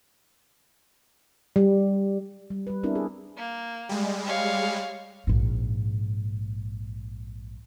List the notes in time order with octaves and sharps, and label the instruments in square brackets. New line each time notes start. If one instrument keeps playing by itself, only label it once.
[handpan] G3
G3
G3 B4
B3 C4 D4 E4 A#4
G#4
[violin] A#3
[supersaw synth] G3 G#3
[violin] C#5 F5
[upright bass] A#1 G#2